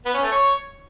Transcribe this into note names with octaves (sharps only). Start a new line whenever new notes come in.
B3
C#4
A3
C#5